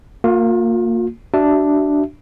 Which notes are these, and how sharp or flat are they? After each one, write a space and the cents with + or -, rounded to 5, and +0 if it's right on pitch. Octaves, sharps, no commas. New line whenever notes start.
A#3 -25 F4 +40
D4 +0 F#4 +35 E5 +0